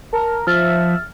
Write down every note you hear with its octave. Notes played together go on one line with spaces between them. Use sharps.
A#4 A5
F3 E5 F6 A6